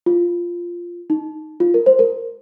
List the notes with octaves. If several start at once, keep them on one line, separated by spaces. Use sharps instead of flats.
F4
D#4
F4
A#4
C5
A#4